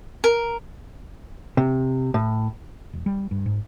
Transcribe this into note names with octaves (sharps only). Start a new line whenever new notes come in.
A#4
C3
A2
E1
G3
G2
G#2